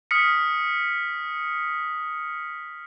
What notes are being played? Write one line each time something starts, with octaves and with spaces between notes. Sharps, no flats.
D#6 F6 B6 C#7